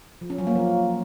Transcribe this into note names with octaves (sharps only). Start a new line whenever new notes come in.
F3
C#4
F#3
A#3
F3